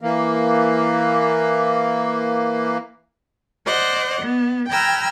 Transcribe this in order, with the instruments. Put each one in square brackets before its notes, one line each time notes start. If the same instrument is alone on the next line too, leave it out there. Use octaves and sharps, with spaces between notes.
[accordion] E3 A#3
[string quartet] C5 D5 D#5 F#5
B3
G5 G#5 A#5 B5 E6 F6